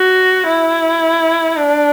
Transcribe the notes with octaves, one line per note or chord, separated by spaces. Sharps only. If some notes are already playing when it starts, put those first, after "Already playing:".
Already playing: F#4
E4
D4